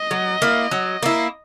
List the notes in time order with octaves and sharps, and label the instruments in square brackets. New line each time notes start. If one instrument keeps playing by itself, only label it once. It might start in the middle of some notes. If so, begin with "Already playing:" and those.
Already playing: [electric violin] D#5
[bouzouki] F#3
A#3 E4
F#3
A#3 E4